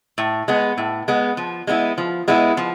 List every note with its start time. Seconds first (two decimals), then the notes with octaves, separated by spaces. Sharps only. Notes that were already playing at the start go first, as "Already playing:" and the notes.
0.18 A2
0.48 G#3 B3
0.78 A2
1.08 G#3 B3
1.37 F3
1.67 G#3 B3 E4
1.98 F3
2.28 G#3 B3 E4
2.57 F3